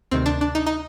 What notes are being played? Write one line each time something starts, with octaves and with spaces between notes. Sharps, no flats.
D2 C3 D#3 C4
D4
D4
D#4
D#4